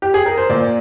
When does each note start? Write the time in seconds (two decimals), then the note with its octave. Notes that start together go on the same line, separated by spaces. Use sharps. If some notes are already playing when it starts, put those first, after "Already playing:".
0.02 G4
0.14 G#4
0.26 A#4
0.38 C5
0.49 A#2 D5